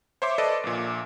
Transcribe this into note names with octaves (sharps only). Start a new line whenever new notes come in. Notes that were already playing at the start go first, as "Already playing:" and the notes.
C5 C#5 E5 C6 D6
A4 B4 D5 D#5
A#1 A#2